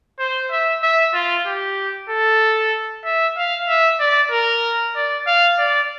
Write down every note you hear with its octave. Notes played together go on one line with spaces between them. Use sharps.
C5
E5
E5
F4
G4
A4
E5
F5
E5
D5
A#4
D5
F5
D5